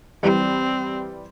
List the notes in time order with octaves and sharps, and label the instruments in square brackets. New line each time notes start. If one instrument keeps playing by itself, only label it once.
[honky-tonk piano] E3 G3 [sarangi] C4